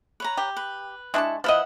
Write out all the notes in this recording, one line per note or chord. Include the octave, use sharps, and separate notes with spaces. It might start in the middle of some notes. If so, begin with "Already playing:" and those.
B4 C#5 A#5
G4
B4
G#3 D4 E4 A5 C#6
F3 E4 B4 D#5 E5 F#5